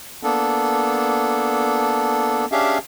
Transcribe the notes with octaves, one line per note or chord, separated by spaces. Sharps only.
A#3 B3 D4 A4
C#4 D4 G4 G#4 E5 F5